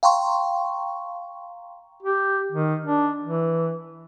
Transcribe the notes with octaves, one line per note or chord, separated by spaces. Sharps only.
F5 G5 A#5 C6 C#6
G4
D#3
D4
E3